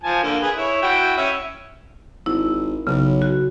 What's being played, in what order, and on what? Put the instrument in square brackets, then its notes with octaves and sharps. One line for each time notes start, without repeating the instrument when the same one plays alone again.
[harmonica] F3 G#5 A5
D3 A#3
G#4 B4
E4 C#5
E4 F#4 G5
C#4 E5
[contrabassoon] G#1 [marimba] E4
[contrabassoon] B1 [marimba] C#3
[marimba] F#4